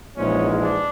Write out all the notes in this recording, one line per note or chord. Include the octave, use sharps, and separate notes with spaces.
A#1 G#2 E3 G#3 C#4
D4